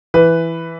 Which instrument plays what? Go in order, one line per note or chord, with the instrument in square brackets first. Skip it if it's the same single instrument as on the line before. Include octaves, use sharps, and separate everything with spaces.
[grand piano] E3 B4